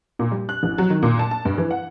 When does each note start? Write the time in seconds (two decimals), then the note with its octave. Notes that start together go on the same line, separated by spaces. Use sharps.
0.19 A#2
0.32 G3
0.49 F#6
0.63 A1
0.78 F#3
0.90 D#3
1.03 A#2
1.19 A5
1.31 A5
1.45 G2
1.58 E3
1.71 F#5